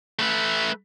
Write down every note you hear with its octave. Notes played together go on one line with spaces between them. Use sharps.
A3 B4